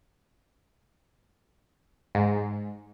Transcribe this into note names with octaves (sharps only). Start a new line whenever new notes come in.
G#2